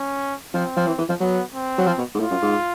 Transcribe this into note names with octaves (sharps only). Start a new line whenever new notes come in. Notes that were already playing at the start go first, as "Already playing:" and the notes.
Already playing: C#4
F3 C4
F3
E3
E3
F3
F#3 B3
C4
F#3
F3
B2
G#2
A2 F4
F#2
G#2